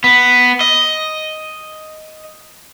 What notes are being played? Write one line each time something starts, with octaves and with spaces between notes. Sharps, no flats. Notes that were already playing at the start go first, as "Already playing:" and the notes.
B3
D#5